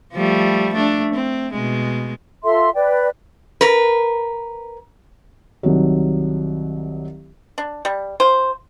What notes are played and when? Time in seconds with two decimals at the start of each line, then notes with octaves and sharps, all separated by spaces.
0.13 F3 G3 A3
0.74 A3 D4
1.14 C4
1.53 B2 G#3
2.44 F4 A4 E5 C6
2.75 B4 D5 G5
3.61 A#4 B4
5.63 C2 D#3 F#3
7.58 D4
7.85 G3
8.20 F4 C5